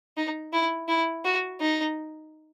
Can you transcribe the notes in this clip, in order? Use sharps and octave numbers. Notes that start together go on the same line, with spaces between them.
D#4
E4
E4
F#4
D#4